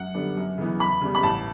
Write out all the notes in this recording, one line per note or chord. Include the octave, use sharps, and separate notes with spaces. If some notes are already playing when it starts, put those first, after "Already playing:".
Already playing: F#2 F#5
D3 G3 B3
F#2
C#3 E3 B3
E2 B5
C#3 G3 B3
B5
A1 A5